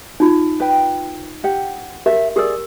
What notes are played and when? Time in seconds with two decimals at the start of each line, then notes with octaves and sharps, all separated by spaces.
0.20 D#4 F4
0.60 B4 G5
1.44 G4 F#5
2.06 G4 A#4 E5
2.36 G4 G#4 A#4 D5 E6